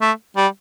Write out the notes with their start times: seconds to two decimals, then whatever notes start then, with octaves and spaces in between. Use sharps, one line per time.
0.01 A3
0.36 G3